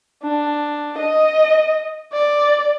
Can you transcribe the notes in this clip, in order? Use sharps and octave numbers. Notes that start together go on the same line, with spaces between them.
D4
D#5
D5